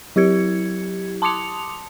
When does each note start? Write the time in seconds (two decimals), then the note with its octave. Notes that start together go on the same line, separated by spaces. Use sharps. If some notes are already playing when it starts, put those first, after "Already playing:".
0.16 F#3 E4 G4 G#6 C#7
1.22 A5 C6 D6 D#6 C#7 F7